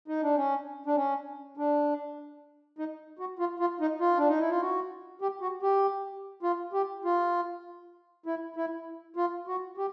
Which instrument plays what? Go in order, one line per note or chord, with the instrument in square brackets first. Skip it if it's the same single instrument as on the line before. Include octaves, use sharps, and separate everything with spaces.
[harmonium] D#4
D4
C#4
D4
C#4
D4
D#4
F#4
F4
F4
D#4
F4
D4
D#4
E4
F4
F#4
G4
F#4
G4
F4
G4
F4
E4
E4
F4
F#4
G4